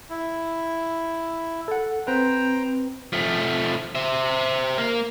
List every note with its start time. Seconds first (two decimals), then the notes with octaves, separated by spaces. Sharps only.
0.10 E4
1.68 A4 F#5
2.07 C4 B4 C5 G5 A#5
3.13 F3 A3
3.95 C5 E5
4.78 A#3